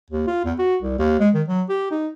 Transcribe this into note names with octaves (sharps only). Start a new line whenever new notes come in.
D#2
F4
E2
F#4
C2
D#2
G#3
D#3
F#3
G4
D#4